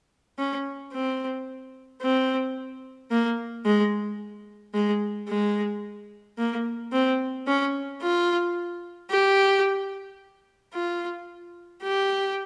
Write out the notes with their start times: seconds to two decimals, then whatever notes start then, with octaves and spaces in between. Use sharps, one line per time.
0.39 C#4
0.93 C4
2.02 C4
3.11 A#3
3.65 G#3
4.74 G#3
5.29 G#3
6.38 A#3
6.92 C4
7.47 C#4
8.02 F4
9.11 G4
10.74 F4
11.83 G4